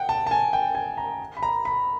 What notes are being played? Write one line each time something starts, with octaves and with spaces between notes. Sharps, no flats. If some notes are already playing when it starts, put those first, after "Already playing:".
Already playing: F#5 G5
A5
A5
G#5
G5
G#5
A#5
B5
A#5
B5